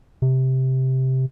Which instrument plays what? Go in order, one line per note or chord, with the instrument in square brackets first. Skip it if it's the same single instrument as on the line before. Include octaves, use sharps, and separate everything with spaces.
[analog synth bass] C3